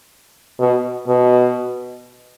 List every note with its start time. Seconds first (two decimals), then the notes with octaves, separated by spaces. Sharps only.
0.59 B2
1.07 B2